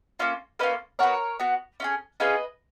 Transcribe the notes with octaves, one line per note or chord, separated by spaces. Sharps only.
A#3 C#4 F4
A#3 C#4 F4 B4 D#5
B3 F#4 A#4 C#5
B3 F#4
C#4 F4 G#4
C#4 F4 G#4 B4 D#5